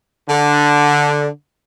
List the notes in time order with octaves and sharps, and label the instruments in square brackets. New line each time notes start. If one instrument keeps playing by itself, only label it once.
[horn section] D3